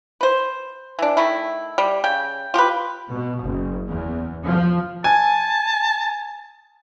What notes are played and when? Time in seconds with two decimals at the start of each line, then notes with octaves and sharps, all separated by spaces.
0.21 B4 C5
0.99 E3 D4
1.17 D#3 A3 E4
1.78 G3
2.04 C#3 G5
2.54 F4 G4 A#4 B4
3.07 B2
3.40 F#1
3.88 E2
4.44 F3
5.04 G#5 A5